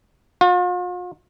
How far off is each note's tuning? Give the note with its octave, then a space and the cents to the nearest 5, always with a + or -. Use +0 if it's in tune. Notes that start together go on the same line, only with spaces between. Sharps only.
F4 +45